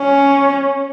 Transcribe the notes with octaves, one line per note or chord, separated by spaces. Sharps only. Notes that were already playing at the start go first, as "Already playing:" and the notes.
Already playing: C#4